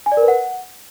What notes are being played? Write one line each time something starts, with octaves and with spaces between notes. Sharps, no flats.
G#5
D5
A#4
B4
F#5